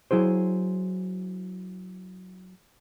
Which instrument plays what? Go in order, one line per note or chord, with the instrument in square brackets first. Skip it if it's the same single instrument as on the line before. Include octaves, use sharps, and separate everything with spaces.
[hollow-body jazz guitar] F#3 E4 G#4 C5